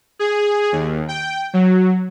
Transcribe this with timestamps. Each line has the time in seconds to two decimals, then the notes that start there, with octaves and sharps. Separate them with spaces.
0.19 G#4
0.72 D#2
1.08 G5
1.53 F#3